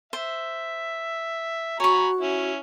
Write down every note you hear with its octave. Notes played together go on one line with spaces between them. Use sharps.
C5 E5
F#4 C#5 G#5 A#5 B5 C#6
C#4 E4